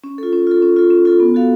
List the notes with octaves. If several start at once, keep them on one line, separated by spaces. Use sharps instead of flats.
C#4
F4 A4
C#4
F4 A4
C#4
F4 A4
C#4
F4 A4
B3
F#4 A4 F5